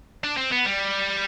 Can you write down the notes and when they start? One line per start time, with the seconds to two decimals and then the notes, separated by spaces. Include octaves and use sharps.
0.24 D4
0.37 C4
0.52 B3
0.66 G3